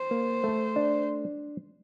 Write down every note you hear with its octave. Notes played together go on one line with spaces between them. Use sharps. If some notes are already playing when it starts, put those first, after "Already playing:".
Already playing: C5
A#3
A3
D4